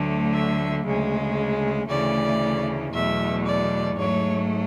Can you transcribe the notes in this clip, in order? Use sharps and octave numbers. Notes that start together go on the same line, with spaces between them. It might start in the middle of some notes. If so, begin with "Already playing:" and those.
Already playing: D2 D3 F#3 A3
E5
D2 C#3 G#3
D2 C#3 E3 A3 D5
E2 B2 F#3 A3 E5
D5
G#2 F#3 A3 C#5